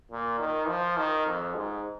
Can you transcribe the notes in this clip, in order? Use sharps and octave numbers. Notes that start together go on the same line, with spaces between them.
A#2
D#3
F3
D#3
F2
G#2